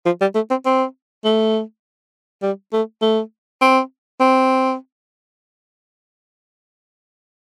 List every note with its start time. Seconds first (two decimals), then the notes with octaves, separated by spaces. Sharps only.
0.06 F3
0.21 G3
0.35 A3
0.50 C4
0.66 C4
1.24 A3
2.42 G3
2.73 A3
3.02 A3
3.61 C4
4.20 C4